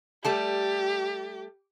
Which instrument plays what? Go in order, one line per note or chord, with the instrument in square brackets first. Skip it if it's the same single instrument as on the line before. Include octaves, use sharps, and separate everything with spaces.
[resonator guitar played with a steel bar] G3 A3 A5 [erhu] G4